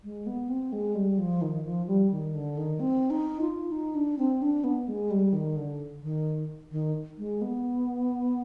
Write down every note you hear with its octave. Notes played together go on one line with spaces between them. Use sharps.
G#3
B3
C4
G#3
G3
F3
D#3
F3
G3
D#3
D3
D#3
C4
D#4
F4
D#4
D4
C4
D4
B3
G#3
G3
D#3
D3
D#3
D#3
G#3
B3